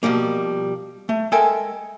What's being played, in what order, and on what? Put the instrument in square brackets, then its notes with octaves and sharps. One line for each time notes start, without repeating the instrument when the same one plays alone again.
[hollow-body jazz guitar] B2 F3 G3 A#3
A3
G#3 A4 A#4 E5 G5 G#5